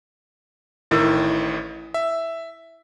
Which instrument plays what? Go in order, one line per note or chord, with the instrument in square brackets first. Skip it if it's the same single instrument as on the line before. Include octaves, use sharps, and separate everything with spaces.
[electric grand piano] A1 A2 D#3 [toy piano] E4 A#4
[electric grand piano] E5